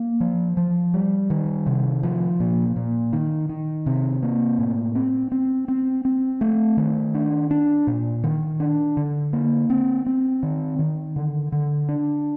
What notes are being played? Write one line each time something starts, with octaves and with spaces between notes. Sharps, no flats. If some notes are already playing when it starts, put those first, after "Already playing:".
Already playing: A#3
F3
F3
G3
D#3
C3
F3
A#2
A#2
D#3
D#3
C3
A#3
A2
C4
C4
C4
C4
A3
D#3
D4
D4
A#2
D#3
D4
D3
A#3
C4
C4
D#3
D#3
D3
D3
D4